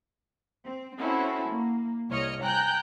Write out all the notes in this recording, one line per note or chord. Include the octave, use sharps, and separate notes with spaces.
C4
C4 C#4 E4 F#4 A4
A#3
C2 C#5 D#5 F6 C#7
G5 G#5 A#5 F#6 G6